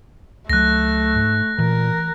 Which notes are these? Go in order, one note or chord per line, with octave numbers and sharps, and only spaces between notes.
C#2 F#3 A3 F#6 A#6
G#2
A#2 E3 A#4